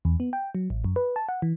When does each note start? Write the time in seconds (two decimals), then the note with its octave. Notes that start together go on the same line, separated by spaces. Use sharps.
0.05 E2
0.20 B3
0.33 G5
0.55 F#3
0.70 A1
0.84 F#2
0.96 B4
1.16 A5
1.29 F#5
1.42 E3